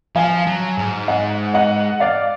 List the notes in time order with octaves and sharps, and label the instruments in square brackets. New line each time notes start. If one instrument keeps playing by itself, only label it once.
[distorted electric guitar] F3 [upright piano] F5 G#5
[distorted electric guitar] F#3
G#2
[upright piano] D#5 F#5
D#5 F#5
D5 F5